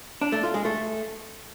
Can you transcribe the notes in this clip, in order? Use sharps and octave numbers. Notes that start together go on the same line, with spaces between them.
D4
A3
F4
G#3
A3